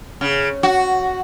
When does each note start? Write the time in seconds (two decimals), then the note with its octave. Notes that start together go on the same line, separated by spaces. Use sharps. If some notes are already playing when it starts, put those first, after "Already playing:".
0.21 C#3
0.63 F#4